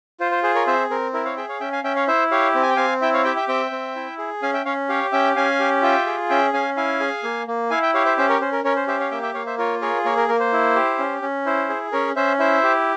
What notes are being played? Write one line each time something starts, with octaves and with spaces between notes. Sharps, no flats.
F4 C5
C5
G#4 C5
A#4 C#5
C4 C5 E5
C4 A#4
E4 A#4
C#5 F5
G#4 E5 G5
C#5 F5
C#4 E5 G5
F5 G#5
C#4 E5 G5
C#5 F5
E4 C5 E5
G4 C#5 F5
C4
G#5
G5
C4 F5 G#5
E4 E5 G5
C#5 F5
G4 E5 G5
E5 G5
C4 E5 G5
C4
E4
G#4
C#4 F5 G#5
E5 G5
C#4 C#5 F5
G4 C#5 F5
C#4 E5 G5
C#4 F5 G#5
G4
F4 E5 G5
G#4
C#4 E5 G5
C#4 F5 G#5
E4 F5 G#5
G#4
A#3
A#3
E4 F5 G#5
E5 G5
G4 C#5 F5
C5 E5
C#4 C5 E5
A#4 C#5
C#4 C5
A#4
C#4 A#4 C#5
C5
G4 C5 E5
C#5 F5
A#3 E5 G5
E5 G5
A#3 C#5 F5
C5 E5
F4 A#4 C#5
G#4 A#4 C#5
A#3 A#4 C#5
A#4
A#3 A#4
C5
E4
G4
C#4
C#4
E4 C5
G#4
C#4 A#4 C#5
C#4 C5 E5
E4 C5 E5
G4